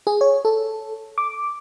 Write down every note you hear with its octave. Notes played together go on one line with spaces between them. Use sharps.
G#4
C#5
A4
D6